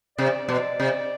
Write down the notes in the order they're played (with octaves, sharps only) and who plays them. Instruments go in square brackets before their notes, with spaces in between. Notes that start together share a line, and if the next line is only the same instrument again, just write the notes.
[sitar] C3 [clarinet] D5
[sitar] B2
C3